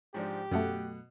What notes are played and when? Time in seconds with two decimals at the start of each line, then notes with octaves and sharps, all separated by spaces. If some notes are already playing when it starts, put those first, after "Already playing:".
0.14 G#2 F3 D4 G4
0.51 F#2 B2 A3 F#5